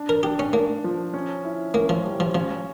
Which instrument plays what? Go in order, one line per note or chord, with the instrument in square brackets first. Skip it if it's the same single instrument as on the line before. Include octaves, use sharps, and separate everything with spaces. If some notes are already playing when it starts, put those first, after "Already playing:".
Already playing: [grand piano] D4
[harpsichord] A#4
[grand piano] D4 [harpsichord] G4
[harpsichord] C#4
[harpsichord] A#3 [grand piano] D4
[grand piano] F3
C#4
E4
[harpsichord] A#3 [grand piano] C#4
[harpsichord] F3
[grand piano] G3
[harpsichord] F3
[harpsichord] F3 [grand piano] C#4